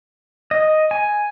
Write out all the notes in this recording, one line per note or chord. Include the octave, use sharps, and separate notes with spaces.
D#5
G#5